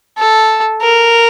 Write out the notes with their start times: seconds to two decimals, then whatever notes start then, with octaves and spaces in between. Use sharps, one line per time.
0.18 A4
0.82 A#4